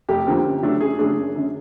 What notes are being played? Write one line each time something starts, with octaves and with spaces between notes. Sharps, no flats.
F1 G4
F2 D3 F3 A#3
F#2
C#3 F#3 A3 D4
F#2 G#4
C#3 F#3 A3 D4 G#4
F#1
F#2 D3